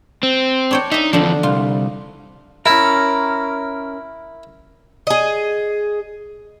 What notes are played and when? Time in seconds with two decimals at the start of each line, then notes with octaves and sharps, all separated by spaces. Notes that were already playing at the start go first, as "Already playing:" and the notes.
0.23 C4
0.71 D4 C#5 G5
0.92 D#4 D#5 E5
1.13 E2 D3 F3 D4
1.43 C2 F4
2.66 C#4 E4 A#4
5.07 G#4 D#5